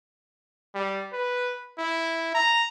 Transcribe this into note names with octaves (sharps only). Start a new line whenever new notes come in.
G3
B4
E4
A#5